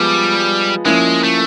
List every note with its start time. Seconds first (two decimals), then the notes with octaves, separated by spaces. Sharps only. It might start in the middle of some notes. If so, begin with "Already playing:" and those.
Already playing: F3 G3 G#3 B3 G#4
0.85 F3 G#3 A#3 C#4 E4
1.23 A3